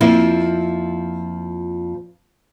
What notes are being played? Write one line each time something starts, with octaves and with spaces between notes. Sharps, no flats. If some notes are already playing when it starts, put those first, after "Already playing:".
F2 F3 A#3 E4